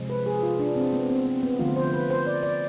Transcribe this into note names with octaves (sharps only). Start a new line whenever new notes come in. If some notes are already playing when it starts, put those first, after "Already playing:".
Already playing: C3 F3 G#3
B4
G#4
F4
D4
C4
B3
C4
C4
B3
D3 F3 A3 F4
C5
B4
C5
D5
D5